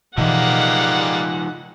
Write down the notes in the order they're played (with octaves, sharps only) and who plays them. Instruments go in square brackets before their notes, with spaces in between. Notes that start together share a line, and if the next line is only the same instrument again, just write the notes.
[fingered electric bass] B2 E3 [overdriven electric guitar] F3 D#4 [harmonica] G3 G#3 A#3 [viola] F#5